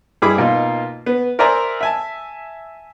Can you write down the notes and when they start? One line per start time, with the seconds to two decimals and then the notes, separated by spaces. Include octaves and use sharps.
0.22 G2 E4 G#4 B5 D6
0.38 B2 A#3 D#4 F4
1.06 B3
1.39 A#4 C5 D5 E5 G#5 A#5
1.81 E5 G#5 A5